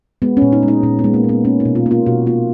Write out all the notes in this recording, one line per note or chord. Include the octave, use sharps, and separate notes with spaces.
G#3 B3
C#4
A#2
D#4
G#3
D#4
A#2 C#4
B3
G#3
A#3
A#2
B3
A#3 C#4
D#4
B2
F4
A#3
F4
B2 F#4
A#3 F4